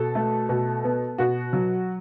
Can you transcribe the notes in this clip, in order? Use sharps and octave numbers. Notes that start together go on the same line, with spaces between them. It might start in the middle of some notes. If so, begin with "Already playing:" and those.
Already playing: B2 A4
A3
B2
B3
B2 F#4
F#3